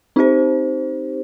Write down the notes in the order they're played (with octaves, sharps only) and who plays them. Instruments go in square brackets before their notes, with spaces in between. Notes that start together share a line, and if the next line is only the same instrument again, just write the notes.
[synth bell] C4 D#4 G4 C5